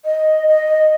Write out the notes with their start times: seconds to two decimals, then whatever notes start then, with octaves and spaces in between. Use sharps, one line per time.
0.05 D#5
0.48 D#5